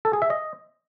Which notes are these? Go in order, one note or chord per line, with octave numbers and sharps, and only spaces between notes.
A4
G#4
E5
D#5